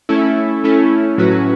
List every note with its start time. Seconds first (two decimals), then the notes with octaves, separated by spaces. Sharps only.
0.09 A3 C#4 E4 A4
0.64 A3 C#4 E4 A4
1.18 A2 F#3 C#4 F#4 B4